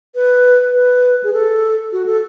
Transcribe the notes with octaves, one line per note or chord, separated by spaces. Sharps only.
B4
B4
G#4
A4
F#4
A4